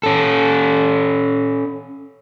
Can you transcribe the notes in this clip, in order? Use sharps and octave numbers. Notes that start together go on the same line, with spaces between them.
C#4 A4